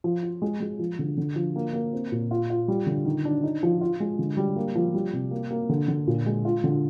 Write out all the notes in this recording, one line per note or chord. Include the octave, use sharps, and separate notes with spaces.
F3
F4
G#3
G#3
F3
D3
D3
F3
A#3
A#3
C4
A#2
F4
F4
G3
D3
D#3
D4
D#4
F3
F4
G#3
D3
G3
A#3
F3
G3
C3
A#3
A#3
D3
D3
A#2
G#3
F4
D3